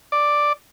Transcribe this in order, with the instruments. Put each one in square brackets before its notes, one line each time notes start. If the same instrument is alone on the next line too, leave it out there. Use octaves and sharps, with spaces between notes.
[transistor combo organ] D5